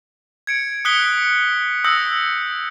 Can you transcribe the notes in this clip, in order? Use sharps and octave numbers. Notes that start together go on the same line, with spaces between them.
G#6 C#7 D7
D#6 F#6 B6 C#7 G7
D#6 E6 G6 A#6 C#7